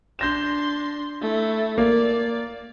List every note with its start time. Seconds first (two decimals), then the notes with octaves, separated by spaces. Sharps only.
0.19 D4 C6 G6 A#6 E7
1.21 A3 E4
1.78 A#3 D5